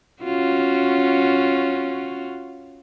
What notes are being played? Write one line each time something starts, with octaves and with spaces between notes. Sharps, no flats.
C#4 F4 F#4